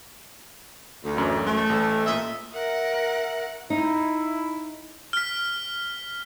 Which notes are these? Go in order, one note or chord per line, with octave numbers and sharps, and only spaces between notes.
D2
A1 F#2
A3
A1 A4
A#2 D#5 E5
A#4 E5 F#5
D#4 E4
F6 B6